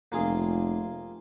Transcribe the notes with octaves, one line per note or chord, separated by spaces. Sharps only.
F1 A#3 F4 G#4